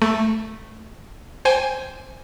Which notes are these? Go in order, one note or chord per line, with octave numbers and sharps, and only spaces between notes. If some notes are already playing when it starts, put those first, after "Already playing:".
A3
C5 G5 G#5